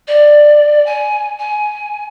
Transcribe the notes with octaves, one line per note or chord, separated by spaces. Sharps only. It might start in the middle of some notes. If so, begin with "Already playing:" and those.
D5
G#5
G#5